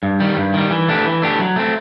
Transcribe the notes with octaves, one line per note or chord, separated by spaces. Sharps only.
G2
D#3 G3
G2
D#3 G3
E3
A3 D4 G4
E3
A3 D4 G4
F#3
A3 C4